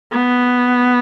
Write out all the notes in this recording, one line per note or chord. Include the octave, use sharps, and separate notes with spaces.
B3